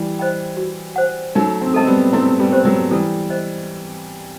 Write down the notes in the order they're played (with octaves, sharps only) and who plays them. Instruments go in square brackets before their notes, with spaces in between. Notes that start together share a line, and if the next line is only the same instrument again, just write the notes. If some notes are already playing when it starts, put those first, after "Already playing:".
Already playing: [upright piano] E3 G3
[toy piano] C5 D#5 G5 B5
F#4
C5 F#5
[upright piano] F#3 A3 [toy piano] D#4
[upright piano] C4
[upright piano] A3 C4 [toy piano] A4 D#5 A5
[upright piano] G3 B3
[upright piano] A3 C4 [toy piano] E4
[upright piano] G3 B3
[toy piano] G4 C5
[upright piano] F#3 A3
[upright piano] E3 G3 [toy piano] A4
[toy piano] C5 D#5